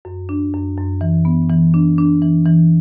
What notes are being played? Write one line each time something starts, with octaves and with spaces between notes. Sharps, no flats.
F#2
D4
F#2
F#2
E3
B3
E3
D4
D4
E3
E3